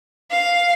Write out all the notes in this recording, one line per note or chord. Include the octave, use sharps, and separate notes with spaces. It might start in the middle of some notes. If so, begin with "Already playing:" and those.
F5